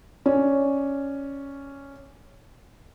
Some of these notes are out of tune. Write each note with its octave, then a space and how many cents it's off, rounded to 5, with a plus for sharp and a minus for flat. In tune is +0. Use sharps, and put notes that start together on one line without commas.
C#4 +0 D5 +0